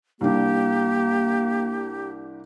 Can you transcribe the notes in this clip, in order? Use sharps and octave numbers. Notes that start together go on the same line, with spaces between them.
C2 A#3 D4 G4